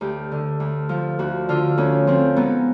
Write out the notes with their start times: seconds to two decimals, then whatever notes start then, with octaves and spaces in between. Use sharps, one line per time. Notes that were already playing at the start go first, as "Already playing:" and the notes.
0.01 D2 G4
0.31 D3
0.60 D2
0.89 F3
1.19 D2 F#4
1.49 D3 F4
1.77 D2 C#4
2.07 F3 C4
2.36 G#2 B3